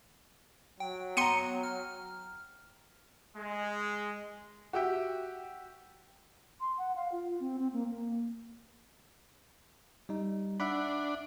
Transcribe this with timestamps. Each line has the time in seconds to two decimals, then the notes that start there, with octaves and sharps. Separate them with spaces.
0.80 F#3 G5
1.17 B3 G5 A#5 C6 C#7 D#7
1.63 F6
3.37 G#3
4.73 F#4 G4 E5 G5
6.60 C6
6.78 F#5
6.96 F5
7.12 F4
7.40 C4
7.59 C4
7.73 A#3
7.90 A#3
10.09 G3 D#4
10.60 D4 E5 F#5 B5